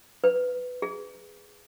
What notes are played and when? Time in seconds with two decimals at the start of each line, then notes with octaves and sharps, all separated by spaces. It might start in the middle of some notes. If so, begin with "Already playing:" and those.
0.24 B4
0.82 G#4